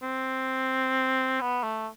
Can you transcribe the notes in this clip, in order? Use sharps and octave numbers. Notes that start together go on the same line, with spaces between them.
C4
B3
A3